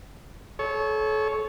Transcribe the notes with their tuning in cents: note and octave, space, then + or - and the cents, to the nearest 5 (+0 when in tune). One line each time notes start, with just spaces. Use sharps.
A4 -35 C#5 +0